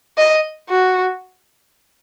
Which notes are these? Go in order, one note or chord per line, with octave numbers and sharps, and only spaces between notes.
D#5
F#4